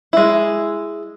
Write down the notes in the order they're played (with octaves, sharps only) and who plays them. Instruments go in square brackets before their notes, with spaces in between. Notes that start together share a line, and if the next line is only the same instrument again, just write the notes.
[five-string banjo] G#3 E4